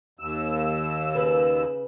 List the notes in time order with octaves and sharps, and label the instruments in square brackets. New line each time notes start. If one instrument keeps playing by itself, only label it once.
[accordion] D#2 E6
[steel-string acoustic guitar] C#3 B4